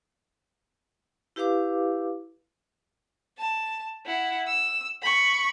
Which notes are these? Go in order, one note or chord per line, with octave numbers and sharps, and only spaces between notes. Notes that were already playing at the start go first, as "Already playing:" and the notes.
E4 G4 B4 F5 D6
A5
E4 F#5
E6
B5 C#6